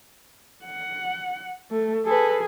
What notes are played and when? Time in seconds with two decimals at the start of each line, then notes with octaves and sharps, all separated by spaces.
0.65 F#5
1.70 A3
2.05 G#4 A4 B4